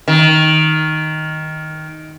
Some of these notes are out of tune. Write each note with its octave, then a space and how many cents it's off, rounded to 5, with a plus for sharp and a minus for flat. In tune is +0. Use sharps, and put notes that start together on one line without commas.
D#3 +5